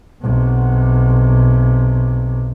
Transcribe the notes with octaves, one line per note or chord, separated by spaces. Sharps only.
B1 C3